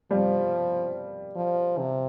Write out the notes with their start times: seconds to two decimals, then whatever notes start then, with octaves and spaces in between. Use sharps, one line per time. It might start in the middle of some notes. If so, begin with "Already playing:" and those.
0.11 F3 G3
1.36 F3
1.78 C3